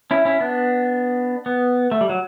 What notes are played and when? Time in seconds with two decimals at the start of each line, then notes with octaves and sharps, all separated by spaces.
0.11 C#4 E4
0.25 C#4 E4
0.40 B3 D4
1.46 B3
1.91 A3
2.01 G3
2.09 F#3